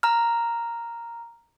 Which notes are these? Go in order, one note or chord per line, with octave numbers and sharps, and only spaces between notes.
A#5 F6